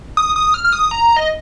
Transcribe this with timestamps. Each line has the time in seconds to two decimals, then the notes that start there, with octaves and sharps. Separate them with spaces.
0.17 D#6
0.36 D#6
0.54 F6
0.64 F6
0.73 D#6
0.91 A#5
1.17 D#5